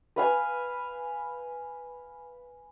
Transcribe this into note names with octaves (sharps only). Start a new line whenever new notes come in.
B4 F5 G#5